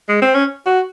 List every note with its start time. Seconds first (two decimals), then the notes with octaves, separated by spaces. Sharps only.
0.09 G#3
0.22 C4
0.34 C#4
0.66 F#4